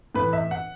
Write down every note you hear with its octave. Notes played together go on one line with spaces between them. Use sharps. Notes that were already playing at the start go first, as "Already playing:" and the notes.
A2 E3 B4
E5
F#5